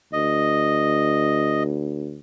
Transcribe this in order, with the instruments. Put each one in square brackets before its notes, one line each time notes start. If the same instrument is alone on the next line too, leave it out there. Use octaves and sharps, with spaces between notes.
[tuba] D2 [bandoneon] D#5